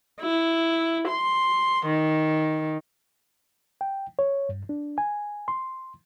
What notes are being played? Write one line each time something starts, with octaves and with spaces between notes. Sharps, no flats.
E4
C6
D#3
G5
C#5
G2
D4
G#5
C6